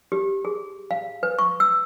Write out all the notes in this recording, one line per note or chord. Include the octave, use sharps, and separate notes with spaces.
G4
G#4
F5
B4
C#6
E6